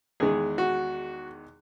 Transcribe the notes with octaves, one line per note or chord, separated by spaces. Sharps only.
E2 D#3 G#3 G#4
F#4